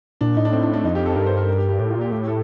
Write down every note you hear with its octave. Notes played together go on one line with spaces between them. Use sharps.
A#2 D4
A2 D#4
D4
C4
D4
D4
F2 D#4
G4
A4
G2 A#4
C5
A#4
A#4
G4
G4
A2 G4
F4
A#2
G4
A2 G4
A4